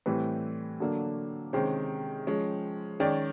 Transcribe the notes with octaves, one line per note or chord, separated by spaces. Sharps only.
A2 E3 G3 C4 B4
D3 F#3 A#3 D4
C3 D#3 G#3 C#4 C5
F3 G#3 C#4
D#3 G#3 C#4 D5